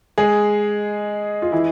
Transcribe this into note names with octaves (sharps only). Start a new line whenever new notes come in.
G#3 G#4
F4
E3 E4